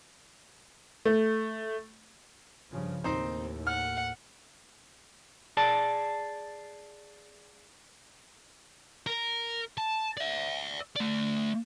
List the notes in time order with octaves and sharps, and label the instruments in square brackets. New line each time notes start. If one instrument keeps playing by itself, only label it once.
[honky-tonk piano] A3
[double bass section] G2 C#3 F3
[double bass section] D#2 A2 [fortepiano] C4 D#4 C5
[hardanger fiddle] F#5 [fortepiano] F6
[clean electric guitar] G#4 D5 A5
[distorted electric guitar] A#4
A5
D5 E5
A3 D5